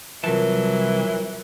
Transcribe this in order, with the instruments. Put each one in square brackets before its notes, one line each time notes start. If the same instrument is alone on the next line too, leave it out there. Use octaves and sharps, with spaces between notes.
[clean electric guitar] C2 A5 [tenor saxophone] E3 [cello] F#3 [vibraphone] F4 A#4 C#5